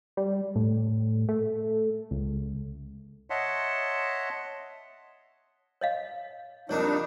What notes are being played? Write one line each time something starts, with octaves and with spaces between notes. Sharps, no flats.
G3
A2
A3
C#2
C#5 D#5 E5 F#5 A5 C6
C#5 D#5 F5
F2 G3 A#3 C4 D4 D#4 C#5